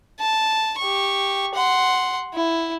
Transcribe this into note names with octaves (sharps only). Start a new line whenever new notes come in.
A5
G4 C#6
F#5 C6
E4